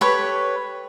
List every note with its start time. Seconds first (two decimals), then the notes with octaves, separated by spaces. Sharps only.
0.01 G4 A4 B4 C#5